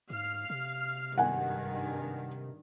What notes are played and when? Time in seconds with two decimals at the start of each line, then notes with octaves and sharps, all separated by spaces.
0.10 G#2 F5 F6
0.50 C3
1.18 G#1 G2 D#3 F#5 G#5